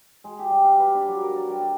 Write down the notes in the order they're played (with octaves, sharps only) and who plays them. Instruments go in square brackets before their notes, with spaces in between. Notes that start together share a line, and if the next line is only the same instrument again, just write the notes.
[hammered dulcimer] G#3
G4
G3
F5
B4
D4
F#3
A#4
D5
G3
A4